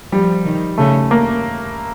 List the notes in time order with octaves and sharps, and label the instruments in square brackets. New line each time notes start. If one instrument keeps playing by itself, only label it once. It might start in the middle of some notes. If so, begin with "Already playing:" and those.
[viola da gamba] F3 [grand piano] G3
[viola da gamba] D#3
[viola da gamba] C#3 [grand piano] A3
[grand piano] A#3